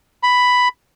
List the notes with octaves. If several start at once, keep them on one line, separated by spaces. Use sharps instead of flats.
B5